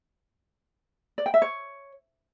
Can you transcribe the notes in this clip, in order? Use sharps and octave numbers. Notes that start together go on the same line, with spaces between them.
D5
G5
E5
C#5